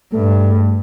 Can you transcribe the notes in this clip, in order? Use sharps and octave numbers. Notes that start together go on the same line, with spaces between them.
G2 A3